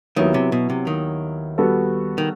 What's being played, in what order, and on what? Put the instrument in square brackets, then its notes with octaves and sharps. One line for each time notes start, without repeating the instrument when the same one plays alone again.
[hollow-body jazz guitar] D#2 D#3 [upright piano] F#3 B3 E4
[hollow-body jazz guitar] C3
B2
C3
D#2 D#3
[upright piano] G3 B3 F#4 A4
[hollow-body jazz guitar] D#3